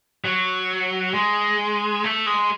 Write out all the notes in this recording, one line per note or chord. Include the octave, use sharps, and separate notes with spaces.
F#3
G#3
A3
G#3